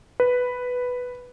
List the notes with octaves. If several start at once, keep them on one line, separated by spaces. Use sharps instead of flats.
B4